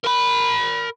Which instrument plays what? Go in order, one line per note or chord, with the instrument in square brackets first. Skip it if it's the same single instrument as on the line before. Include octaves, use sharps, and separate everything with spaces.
[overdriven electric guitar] A#4 B5